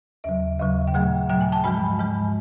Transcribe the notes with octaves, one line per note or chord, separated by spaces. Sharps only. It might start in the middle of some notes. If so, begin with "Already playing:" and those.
D#2 C#3 F#3 E5
D#2 C#3 F#3 F5
G5
A#2 F#3 A3 F#5
A#2 F#3 A3 G5
G#5
A5
G#2 F3 G#3 B5
G#2 F3 G#3